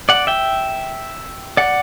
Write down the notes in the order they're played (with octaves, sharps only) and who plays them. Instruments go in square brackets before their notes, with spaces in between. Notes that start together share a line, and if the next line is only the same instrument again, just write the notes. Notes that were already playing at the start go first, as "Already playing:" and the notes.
[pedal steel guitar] D5 F#5
E5 G5
D5 F#5